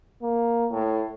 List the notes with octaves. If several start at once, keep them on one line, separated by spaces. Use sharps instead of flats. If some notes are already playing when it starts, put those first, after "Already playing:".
A#3
A2